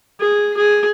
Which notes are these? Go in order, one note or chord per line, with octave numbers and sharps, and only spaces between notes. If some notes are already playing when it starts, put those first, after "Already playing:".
G#4
G#4